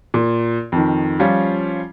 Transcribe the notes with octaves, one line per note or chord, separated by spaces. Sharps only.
A#2
F2 D#3
F3 G3 C#4 F4